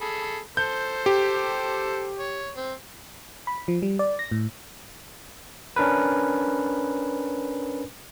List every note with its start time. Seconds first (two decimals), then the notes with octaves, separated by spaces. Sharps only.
0.01 G#4 A4 B5
0.57 A4 C5 G6
1.06 G4
2.18 C#5
2.57 C4
3.47 B5
3.68 F3
3.82 G3
3.99 D5
4.19 A#6
4.31 A2
5.76 C#4 D4 A#4 B4